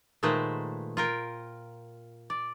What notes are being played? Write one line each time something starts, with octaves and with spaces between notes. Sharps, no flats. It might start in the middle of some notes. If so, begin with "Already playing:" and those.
A#2 D#3 G#3 A3 B4 C5
F4 A#4 G5
D5